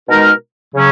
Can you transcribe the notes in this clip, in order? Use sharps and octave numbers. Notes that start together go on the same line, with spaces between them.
B2 G#3 D#4 A#4
C#3 F#3 C#4